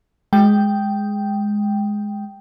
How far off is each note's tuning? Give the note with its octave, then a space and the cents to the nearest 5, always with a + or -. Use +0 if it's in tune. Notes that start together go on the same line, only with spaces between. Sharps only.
G#3 +0 G5 +0